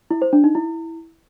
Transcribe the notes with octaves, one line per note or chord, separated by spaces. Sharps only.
E4
C5
D4
D#4
E4